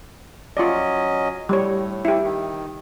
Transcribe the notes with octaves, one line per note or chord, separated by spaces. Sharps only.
F#3 C#4 F4 D5 D#5
A2 G3 C#5
E4 G4
D#3